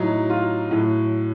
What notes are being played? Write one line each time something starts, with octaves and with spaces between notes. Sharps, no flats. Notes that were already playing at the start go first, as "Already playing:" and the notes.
Already playing: A2 F#3 D#4
F4
A2 F#3 F#4